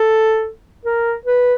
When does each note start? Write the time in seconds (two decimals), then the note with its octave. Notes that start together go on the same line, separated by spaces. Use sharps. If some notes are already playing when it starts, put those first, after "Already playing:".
Already playing: A4
0.86 A#4
1.26 B4